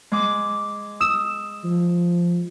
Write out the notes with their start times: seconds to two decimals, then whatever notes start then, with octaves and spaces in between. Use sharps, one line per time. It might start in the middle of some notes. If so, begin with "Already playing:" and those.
0.12 G#3 D6
1.01 D#6 E6 E7
1.64 F3